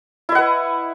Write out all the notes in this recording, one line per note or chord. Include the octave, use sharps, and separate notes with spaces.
E4 B4 D#5 F#5